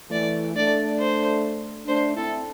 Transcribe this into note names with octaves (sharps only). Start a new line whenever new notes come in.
E3 A3 D5
A3 D4 D5
C5
A3 D4 C5
C4 E4 A4